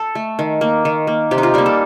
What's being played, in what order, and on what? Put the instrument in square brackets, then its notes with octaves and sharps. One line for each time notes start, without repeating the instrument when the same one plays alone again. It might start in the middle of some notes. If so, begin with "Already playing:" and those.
Already playing: [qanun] A4
A3
D#3
A#3
D#3
A#3
C3 G4
D#4
F4
G3 A#3 A#4
A4